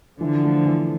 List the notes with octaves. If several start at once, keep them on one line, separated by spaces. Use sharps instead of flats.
D3 E3 F3
A3
E3